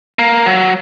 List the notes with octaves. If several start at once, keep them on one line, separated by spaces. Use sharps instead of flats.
A#3
F#3